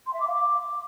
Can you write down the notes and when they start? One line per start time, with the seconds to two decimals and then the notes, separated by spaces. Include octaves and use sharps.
0.06 C6
0.13 E5
0.20 D6
0.27 F5
0.34 D6